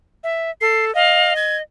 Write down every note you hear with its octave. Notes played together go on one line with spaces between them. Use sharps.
E5
A4 C7
D#5 F5
G#6